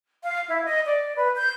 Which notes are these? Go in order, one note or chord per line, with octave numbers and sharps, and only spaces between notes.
F5
E4
D#5
D5
B4
G6